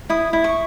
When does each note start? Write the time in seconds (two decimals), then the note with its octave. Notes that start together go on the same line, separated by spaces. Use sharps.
0.10 E4 D#6
0.33 E4
0.44 C#6